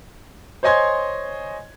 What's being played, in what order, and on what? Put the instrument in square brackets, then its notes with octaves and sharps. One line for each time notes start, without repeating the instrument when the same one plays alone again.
[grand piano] C5 C#5 D#5 G#5 C6 G#6